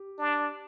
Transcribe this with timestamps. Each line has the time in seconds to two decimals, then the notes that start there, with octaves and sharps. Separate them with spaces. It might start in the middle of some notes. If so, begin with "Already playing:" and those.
Already playing: G4
0.19 D4